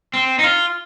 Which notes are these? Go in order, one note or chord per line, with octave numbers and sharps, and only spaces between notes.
C4
D#4
F4